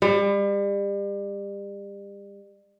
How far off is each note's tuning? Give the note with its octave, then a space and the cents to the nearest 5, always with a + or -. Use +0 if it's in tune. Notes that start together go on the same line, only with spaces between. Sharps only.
G3 +35